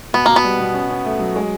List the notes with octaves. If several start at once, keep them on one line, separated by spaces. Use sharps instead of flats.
B2 B3
B2 A#3
B3
G3
B2
C#4
C#4
A3
F#3
G#3